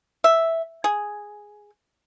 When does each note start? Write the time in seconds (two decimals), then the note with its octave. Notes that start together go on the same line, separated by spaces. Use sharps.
0.24 E5
0.84 G#4